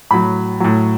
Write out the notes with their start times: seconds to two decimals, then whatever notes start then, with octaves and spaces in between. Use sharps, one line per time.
0.11 A2 F#3 B5
0.60 A2 F#3